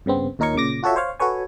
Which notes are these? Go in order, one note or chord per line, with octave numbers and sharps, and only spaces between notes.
G2 C#3 B3 C4
D#2 A#2 D#4 A#4 C#5 C#6
A#2 C#3 D6 A#6
F4 F#4 A4 C#5 E5
C5 C#5 F5
F#4 A4 B4 C#5 G#5